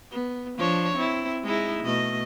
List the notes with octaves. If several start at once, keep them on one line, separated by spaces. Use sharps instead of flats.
B3
F3 D4 C#5
C4 E4
G#3 D#4 E4
B2 A3 D#5